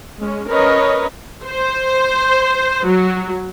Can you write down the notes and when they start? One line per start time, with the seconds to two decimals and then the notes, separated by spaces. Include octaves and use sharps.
0.18 G#3 C#4
0.49 C#4 A#4 B4 C#5 D#5
1.47 C5
2.86 F#3